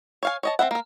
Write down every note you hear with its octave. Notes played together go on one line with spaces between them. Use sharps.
C#5 F5 G#5
C#5 D#5 A5
C4 D#4 E5 F#5
A#3 A#4